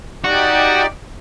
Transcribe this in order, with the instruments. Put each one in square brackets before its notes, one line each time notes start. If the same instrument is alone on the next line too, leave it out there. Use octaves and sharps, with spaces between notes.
[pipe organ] D#4 G4 D5 [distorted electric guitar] F#4